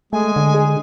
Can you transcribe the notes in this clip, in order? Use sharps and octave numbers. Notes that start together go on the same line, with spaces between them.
G#3 A3 G#5
D3
G#4